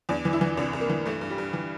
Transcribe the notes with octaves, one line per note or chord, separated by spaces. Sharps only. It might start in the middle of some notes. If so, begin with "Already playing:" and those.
E2 D4
E3
E4
E3
C2 D4
C2
A#3
E3
G2 A3
G2
G3
G2
E3